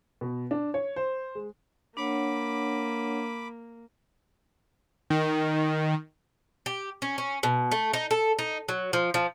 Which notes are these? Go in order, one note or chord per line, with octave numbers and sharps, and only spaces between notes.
B2
D4
C#5
C5
G#3
A#3 D4 C#5 F#5 B5 D6
D#3
G4
C#4
C#4
B2
A3
D#4
A4
D#4
F#3
F3
F3